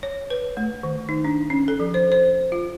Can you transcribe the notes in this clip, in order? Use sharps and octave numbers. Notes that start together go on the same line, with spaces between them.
C#5
B4
A3
D#3
D#4
D4
C#4
A4
F3
C5
C5
F4